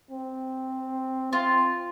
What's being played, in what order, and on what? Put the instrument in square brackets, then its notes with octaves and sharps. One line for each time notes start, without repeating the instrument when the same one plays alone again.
[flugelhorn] C4
[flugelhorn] C4 [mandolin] F4